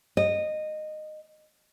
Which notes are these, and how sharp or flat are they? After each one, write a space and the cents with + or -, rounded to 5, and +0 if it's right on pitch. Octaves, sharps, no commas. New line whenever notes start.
D#5 -15